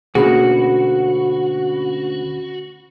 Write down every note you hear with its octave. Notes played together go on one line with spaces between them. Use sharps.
D2 B2 A#3 C#4 F#4 G#4 B5